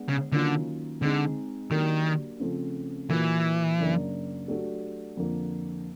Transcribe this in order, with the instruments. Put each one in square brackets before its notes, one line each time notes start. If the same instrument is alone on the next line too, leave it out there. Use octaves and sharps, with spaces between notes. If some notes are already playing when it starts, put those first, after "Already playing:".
Already playing: [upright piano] G#3 B3 D4
[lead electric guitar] C#3
[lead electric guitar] D3 [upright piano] D#3 F#3 A#3 C#4 F4
[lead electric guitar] D3 [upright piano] G#3 C4 D#4 G#4
[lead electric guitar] D#3 [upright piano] F#3 A#3 D4 G4 A#4
[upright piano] C#3 F3 A3 C4
[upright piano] A#2 F#3 A#3 [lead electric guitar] E3
[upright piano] F#2 C#3 F#3 A#3 D4
F#3 A3 D4 G4
F2 D3 F3 A#3